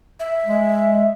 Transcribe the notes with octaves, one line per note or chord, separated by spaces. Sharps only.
E5
G#3